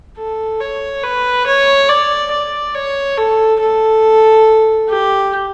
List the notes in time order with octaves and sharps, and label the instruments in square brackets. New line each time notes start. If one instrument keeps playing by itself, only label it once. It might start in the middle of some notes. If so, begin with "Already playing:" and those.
[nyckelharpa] A4
C#5
B4
C#5
D5
D5
C#5
A4
A4
G4